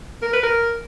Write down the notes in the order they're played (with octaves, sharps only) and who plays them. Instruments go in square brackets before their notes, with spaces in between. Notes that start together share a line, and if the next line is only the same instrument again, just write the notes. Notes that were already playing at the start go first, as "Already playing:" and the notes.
[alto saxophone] A#4
B4
A#4